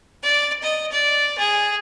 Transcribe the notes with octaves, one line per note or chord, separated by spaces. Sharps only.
D5
D#5
D5
G#4